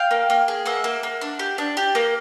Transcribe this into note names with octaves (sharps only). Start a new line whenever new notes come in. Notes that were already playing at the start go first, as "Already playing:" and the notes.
Already playing: F5 G5
A#3
A#3
G#4
A#3 E5 F#5
A#3
A#3
D4
G4
D4
G4
A#3